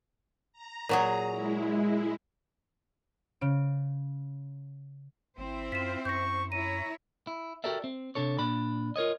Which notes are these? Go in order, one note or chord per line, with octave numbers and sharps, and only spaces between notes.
A#5
A#2 F#3 G#4
G#3 E4
C#3 D7
G#1 C4 E4 C5
F#2 F4 B6 E7
F#2 C#6 G6 A#6
E4 C#5 A#5 D#7
E4
F#4 G4 A4 A#4 D5 E5
C4
C3 D4 A4 C#5
A#2 D4 B5
F4 A#4 C#5 D#5